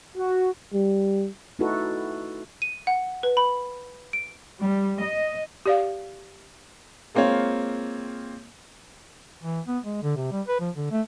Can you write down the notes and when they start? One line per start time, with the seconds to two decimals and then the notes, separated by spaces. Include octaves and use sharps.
0.17 F#4
0.73 G3
1.59 A3 D#4 E4 F#4 A4 B4
2.62 D#7
2.87 F#5
3.23 B4
3.37 B5
4.13 D7
4.61 G3
5.03 D#5
5.66 G4 D5 F5
7.15 G#3 A#3 C4 F4 C#5
9.43 E3
9.67 B3
9.85 G#3
10.03 D3
10.17 C3
10.31 G3
10.48 B4
10.61 F3
10.76 D3
10.91 A3